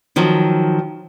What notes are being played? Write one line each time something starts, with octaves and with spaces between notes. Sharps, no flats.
D#3 F3 F#3